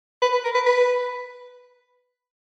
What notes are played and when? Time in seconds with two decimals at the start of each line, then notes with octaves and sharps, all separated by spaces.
0.22 B4
0.33 B4
0.44 A#4
0.55 B4
0.66 B4